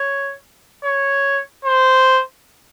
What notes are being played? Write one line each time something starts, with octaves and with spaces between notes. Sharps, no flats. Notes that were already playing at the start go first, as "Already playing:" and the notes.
Already playing: C#5
C#5
C5